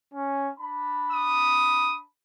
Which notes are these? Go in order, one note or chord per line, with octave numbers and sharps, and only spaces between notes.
C#4
D4 A5 B5
D#6